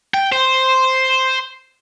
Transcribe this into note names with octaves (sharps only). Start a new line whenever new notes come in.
G5
C5